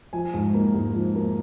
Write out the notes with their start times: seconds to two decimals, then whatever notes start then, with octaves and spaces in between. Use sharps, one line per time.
0.13 F3 G#5
0.34 G#2
0.54 A#3
0.74 G#2
0.94 F3
1.15 A#3